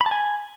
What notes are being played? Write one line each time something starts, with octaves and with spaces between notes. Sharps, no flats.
B5
A5
G#5